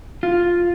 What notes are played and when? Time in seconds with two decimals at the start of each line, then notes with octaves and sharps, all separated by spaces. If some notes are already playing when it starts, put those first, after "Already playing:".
0.23 F4